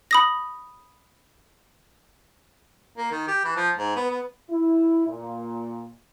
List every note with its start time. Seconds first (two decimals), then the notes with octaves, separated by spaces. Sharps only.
0.11 B5 D#6 A#6
2.97 A#3
3.12 D#3
3.28 G4
3.44 E3
3.56 F3
3.77 G#2
3.96 B3
4.10 B3
4.51 E4
5.07 A#2